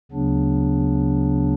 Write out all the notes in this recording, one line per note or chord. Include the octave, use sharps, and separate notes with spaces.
D2 C#3 F#3 B3 D4